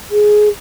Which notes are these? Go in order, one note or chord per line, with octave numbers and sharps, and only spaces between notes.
G#4